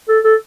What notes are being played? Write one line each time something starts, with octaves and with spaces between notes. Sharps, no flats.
A4
A4